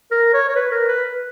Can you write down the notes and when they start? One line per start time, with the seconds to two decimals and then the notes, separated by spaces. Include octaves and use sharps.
0.11 A#4
0.34 C#5
0.49 C#5
0.55 B4
0.71 A#4
0.88 B4